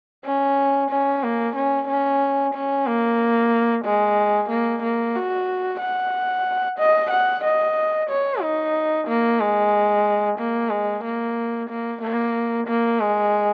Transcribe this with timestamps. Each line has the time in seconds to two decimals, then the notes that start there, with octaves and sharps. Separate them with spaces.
0.25 C#4
0.90 C#4
1.23 A#3
1.55 C#4
1.88 C#4
2.54 C#4
2.87 A#3
3.85 G#3
4.49 A#3
4.83 A#3
5.16 F#4
5.80 F#5
6.79 D#5
7.11 F#5
7.44 D#5
8.10 C#5
8.41 D#4
9.08 A#3
9.40 G#3
10.39 A#3
10.70 G#3
11.04 A#3
11.69 A#3
12.01 A#3
12.67 A#3
13.00 G#3